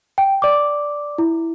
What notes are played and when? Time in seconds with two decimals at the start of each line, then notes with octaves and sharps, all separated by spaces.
0.18 G5
0.42 D5 D6
1.18 E4